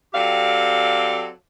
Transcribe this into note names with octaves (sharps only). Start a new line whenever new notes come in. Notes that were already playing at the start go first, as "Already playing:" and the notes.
F#3 C4 G4 A4 D5 F5